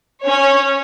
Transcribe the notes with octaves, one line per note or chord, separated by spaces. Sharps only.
C#4 C#5